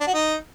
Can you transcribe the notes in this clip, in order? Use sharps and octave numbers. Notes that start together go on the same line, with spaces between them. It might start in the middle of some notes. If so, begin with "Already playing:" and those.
D4
F#4
D#4